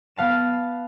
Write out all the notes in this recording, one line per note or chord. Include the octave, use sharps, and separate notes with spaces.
B3 F5 A5 E7